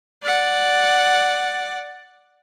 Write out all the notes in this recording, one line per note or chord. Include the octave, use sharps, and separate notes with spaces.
D5 F#5